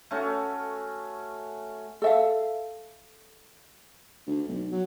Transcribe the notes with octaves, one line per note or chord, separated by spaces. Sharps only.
A3 C#4 F#4
A4 E5 F5
D2
B1
F#3